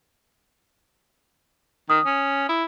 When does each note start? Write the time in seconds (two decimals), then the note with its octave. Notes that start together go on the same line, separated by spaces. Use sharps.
1.90 D#3 D#6
2.06 C#4
2.49 E4